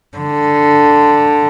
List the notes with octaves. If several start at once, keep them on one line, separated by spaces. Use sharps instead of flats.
D3